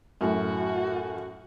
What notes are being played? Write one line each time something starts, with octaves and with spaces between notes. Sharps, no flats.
F#2 A2 F#4